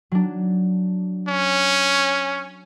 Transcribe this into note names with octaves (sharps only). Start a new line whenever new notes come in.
F#3 D4
C#4